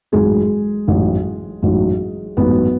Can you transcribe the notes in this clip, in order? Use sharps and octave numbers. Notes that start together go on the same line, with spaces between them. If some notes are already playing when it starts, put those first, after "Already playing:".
A1 G#2 F#3 G#3 G#4
A1 G#2 F#3
A1 G#2 F#3
A1 G#2 F#3 B3